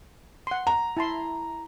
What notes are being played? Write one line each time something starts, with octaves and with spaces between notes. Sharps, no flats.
F#5 C6
A#5
E4 A5 C6